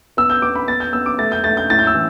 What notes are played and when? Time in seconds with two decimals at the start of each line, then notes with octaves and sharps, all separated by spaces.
0.17 B3 E6
0.30 G6
0.42 B3 D6
0.55 B5
0.68 B3 A6
0.80 G6
0.93 B3 E6
1.06 D6
1.19 A3 A6
1.32 G6
1.44 A3 A6
1.57 G6
1.70 A2 A6
1.79 G6
1.87 E6
1.94 E3